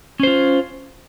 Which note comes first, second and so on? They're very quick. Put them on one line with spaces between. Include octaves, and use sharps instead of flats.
C#4 C5 F4